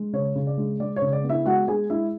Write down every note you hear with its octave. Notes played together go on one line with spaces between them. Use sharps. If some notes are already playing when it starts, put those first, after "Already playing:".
Already playing: G#3
C#3 C#5
C#3
D5
G#3
G#3 D5
C#5
C#3
D5
B3
E4 E5
G#3 F#4 F#5
G#3 G#4 G#5
G#3 E4 E5